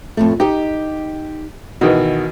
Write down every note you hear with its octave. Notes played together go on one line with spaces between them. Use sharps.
F2 A2 A3
D#4 G4 D#5
B2 D#3 E3 F#4